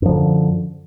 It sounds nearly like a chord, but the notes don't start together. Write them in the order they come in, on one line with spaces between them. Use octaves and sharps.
F#2 F3 D3